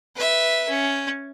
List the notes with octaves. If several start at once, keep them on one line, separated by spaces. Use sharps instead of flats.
B4 E5
C#4